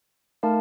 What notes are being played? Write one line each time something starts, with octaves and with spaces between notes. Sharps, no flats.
A3 D#4 A#4 F5 A5